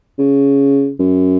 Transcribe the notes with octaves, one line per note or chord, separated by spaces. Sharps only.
C#3
F#2